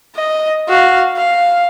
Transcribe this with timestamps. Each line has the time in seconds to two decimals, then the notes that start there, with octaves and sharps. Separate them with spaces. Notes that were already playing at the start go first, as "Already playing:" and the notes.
0.16 D#5
0.68 F#4 F5
1.17 F5